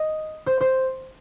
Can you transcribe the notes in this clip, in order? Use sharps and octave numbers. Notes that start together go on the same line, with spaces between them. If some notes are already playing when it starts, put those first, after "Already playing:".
Already playing: D#5
C5
C5